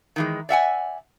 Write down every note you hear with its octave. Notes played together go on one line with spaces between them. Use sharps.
D#3 E3 G#3
D5 E5 F#5 G#5